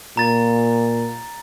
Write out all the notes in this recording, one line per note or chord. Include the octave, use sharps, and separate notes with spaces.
A#2 A#5 A6